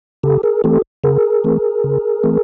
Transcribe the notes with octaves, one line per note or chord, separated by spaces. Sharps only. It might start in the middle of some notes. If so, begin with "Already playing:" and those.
C#3 G4 A4
G#4 A#4
E3 A3 C4 G4 A4
C#3 G#4 A#4
E3 A3 C4
C#3
E3 A3 C4